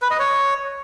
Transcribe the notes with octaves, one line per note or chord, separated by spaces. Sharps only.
B4
D#5
C#5